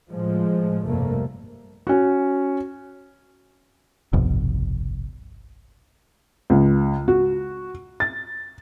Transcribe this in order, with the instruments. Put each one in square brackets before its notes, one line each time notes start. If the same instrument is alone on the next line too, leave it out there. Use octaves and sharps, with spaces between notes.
[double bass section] A2 F3 G#3
F1 B1 G2 C3 A3 A#3
[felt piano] C#4 F#4
[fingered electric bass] G1 C2 F2 B2
[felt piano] C#2
F#4
A6